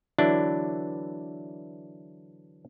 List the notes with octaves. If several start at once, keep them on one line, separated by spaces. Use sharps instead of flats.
D3 E3 F#3 D4 E4